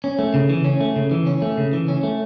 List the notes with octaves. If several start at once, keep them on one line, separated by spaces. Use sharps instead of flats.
C#4
A3
C#3
E3
C#4
A3
C#3
E3
C#4
A3
C#3
E3
C#4
A3